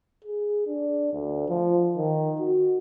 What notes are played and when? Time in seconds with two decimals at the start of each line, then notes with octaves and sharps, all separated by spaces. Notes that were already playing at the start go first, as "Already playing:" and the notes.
0.25 G#4
0.67 D4
1.13 D2
1.48 F3
1.97 D#3
2.40 F#4